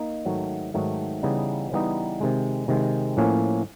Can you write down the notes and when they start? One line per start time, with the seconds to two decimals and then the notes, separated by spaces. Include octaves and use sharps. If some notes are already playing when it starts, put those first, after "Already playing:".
Already playing: A#3 D#4
0.26 G#2 D#3 F#3 A3
0.74 G#2 D#3 F#3 A3
1.23 C#3 E3 G3 B3 D#4
1.71 C#3 E3 G3 B3 D#4
2.21 C3 D#3 G#3
2.68 C3 D#3 G#3
3.17 A2 F3 A#3 C#4